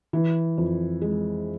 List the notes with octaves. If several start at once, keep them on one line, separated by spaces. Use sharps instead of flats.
E3
F2
G#3